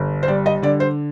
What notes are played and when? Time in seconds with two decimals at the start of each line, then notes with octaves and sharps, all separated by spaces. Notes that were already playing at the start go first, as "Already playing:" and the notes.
Already playing: G1
0.23 C5
0.28 G3 D5
0.46 D#5
0.62 D3 D5
0.80 C5